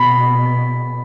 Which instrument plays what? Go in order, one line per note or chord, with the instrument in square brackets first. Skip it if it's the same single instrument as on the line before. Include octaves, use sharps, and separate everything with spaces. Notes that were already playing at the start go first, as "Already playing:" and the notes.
Already playing: [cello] B2 [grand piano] B5